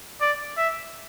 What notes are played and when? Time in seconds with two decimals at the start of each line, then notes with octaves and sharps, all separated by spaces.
0.21 D5
0.57 E5